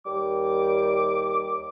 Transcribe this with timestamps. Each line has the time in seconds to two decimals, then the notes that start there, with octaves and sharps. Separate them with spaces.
0.05 D#2 G3 D6